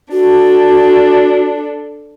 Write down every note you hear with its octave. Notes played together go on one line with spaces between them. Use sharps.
D4 F#4 A4